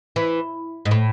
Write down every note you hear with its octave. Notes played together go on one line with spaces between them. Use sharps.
E3
G#2
A2